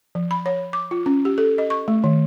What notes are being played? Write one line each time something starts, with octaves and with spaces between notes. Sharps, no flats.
F3
B5
C#5
D6
F4
C#4
G4
A4
D#5
C#6
A3
D#3